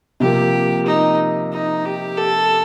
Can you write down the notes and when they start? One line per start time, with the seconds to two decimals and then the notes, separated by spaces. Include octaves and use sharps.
0.20 C3 F3 A#3 G4
0.86 D#4
1.53 D#4
1.86 G4
2.18 A4